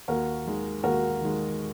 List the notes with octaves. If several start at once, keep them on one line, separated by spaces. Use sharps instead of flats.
D#2 F#4 A#4
D#3 G#3
D#2 F#4 A#4
D#3 G#3